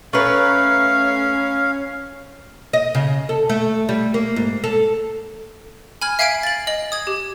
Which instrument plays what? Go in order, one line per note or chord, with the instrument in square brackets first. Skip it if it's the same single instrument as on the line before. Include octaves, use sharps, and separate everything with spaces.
[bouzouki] A3 A#4 B4 [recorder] C#4 [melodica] F5
[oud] D#5
C#3
A4
A3
G3
A#3
G#2
A4
[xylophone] G#5 B5 F6 G#6
E5 F5 G#5 G#6 C7 D7
A6 F#7
D#5 F#7
D#6 G#6
G4